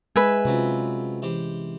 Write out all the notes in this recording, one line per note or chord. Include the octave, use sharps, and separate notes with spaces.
G#3 B4 E5 G#5
C3 F#3 C4 C#4 F4
E3 G4 C5